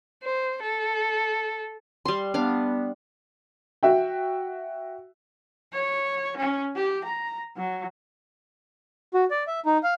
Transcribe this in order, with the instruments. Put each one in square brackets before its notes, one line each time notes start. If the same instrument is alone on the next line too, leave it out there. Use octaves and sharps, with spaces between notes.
[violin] C5
A4
[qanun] G3 C6
[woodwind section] B3 [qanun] D4 F5
[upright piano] F#4 E5 G5
[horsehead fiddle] C#5
C#4
G4
A#5
F#3
[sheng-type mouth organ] F#4
D5
E5
D#4
F5